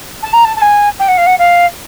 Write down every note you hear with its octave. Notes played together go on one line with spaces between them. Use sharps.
A5
A#5
A5
A5
G#5
G5
F#5
F5
F#5
F5